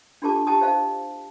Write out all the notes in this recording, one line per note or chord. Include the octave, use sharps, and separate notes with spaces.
D4 F4 G4 A4 A5 D6
E4 G4 G5 A5 A#5 D#6
C5 D#5 F5 A5